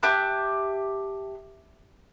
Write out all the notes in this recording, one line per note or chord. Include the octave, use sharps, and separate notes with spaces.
G4 E5 A5 F#6